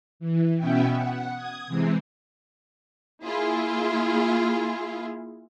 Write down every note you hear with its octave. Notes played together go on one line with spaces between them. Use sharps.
E3
B2 B3 C#4 E5 G5
F#5
D#6 G#6
C3 E3 G#3 C4
A#3 E4 F4 G#4